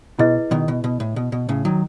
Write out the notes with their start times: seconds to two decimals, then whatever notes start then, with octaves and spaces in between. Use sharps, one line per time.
0.19 B2 E4 G#4 B4 D#5
0.51 B2 D#3
0.68 B2
0.84 B2
1.00 A2
1.16 B2
1.32 B2
1.49 A2 C#3
1.65 D#3 F#3